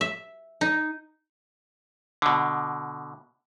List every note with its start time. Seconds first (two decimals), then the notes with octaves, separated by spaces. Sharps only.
0.01 E5
0.61 D#4
2.22 B2 D3